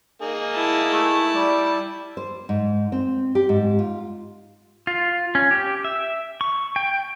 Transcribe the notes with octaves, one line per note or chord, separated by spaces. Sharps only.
A#3 D#4 G#4
E4 A5
A3
G3 D5
C5
G#2
C4
G4
G#2
F4
F4
C#4
G4
E5
C#6
G5